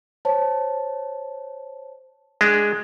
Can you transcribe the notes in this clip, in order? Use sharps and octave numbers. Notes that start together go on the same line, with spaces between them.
C5 C#5 A5
G#3 D4